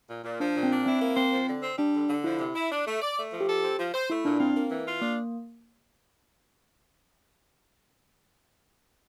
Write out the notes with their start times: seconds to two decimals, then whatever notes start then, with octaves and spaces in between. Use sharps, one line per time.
0.09 A#2
0.24 A#2
0.40 F3 D4
0.55 A#2
0.63 C4
0.70 D4
0.86 C4 E4
1.02 A#3
1.17 C4 C5
1.32 F3
1.48 D3
1.62 C4
1.78 G3 D4
1.94 D3
2.09 D3
2.24 F3 E4
2.40 C3
2.55 E4
2.71 D4
2.87 A3
3.02 D5
3.17 A3
3.33 F3
3.41 G4
3.47 A4
3.63 C4
3.78 F3
3.94 C5
4.10 A3 E4
4.25 A#2 D4
4.40 C4 F4
4.56 A#3
4.71 E3
4.87 F4
5.01 A#3 D4